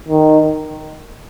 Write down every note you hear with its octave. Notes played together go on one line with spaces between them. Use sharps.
D#3